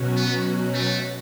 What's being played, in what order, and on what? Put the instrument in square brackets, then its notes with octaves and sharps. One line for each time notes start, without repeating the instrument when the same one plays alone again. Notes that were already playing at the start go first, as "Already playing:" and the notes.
Already playing: [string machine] B2 F#3 C#4 F#4
[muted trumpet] B3
A3